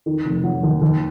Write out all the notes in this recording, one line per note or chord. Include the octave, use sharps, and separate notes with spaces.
D#3
F1
F#3
D#2
D#2